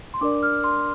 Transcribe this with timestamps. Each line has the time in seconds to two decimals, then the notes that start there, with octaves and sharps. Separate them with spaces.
0.14 C6
0.21 D4 A#4 D5 D6
0.43 F6
0.64 C6